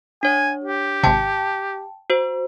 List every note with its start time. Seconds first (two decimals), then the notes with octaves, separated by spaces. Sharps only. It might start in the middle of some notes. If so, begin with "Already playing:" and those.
0.23 D4 C#5 G#5
0.64 G4
1.03 G#1 C3 G5 A5
2.10 F#4 C5